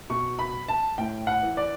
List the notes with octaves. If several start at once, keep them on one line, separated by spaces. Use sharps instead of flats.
B2 C#6
B5
A5
A2 G5
F#5
E3
D5